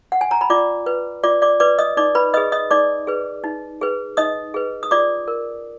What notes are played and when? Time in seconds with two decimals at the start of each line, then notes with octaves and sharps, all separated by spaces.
0.12 F#5
0.21 G#5
0.31 A#5
0.41 B5
0.50 F4 D5 D6
0.86 B4
1.23 F4 D5 D6
1.42 D5 D6
1.60 B4 D5 D6
1.79 D#5 D#6
1.97 D#4 D5 D6
2.15 B4 B5
2.34 G#4 B4 D#5 D#6
2.52 D#5 D#6
2.71 D#4 D5 D6
3.07 G#4 B4
3.44 D#4
3.81 G#4 B4
4.17 D#4 D#5 D#6
4.54 G#4 B4
4.83 D#6
4.91 F4 D5 D6
5.28 A#4